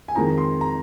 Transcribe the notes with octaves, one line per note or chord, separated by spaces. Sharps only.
G#5
F2 D#3 G#3 A#5
C6
A#5